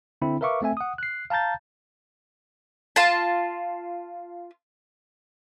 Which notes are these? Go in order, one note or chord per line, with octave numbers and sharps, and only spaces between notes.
D3 C4 E4 B5
A#4 B4 E5 F5 C#6 D6
A3 C4 E5 G#5
F#5 D#6
F#6 C7
F5 A5 A#5 G6 A6
F4 A5